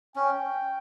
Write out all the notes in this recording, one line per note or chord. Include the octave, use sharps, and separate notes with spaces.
C#4 G5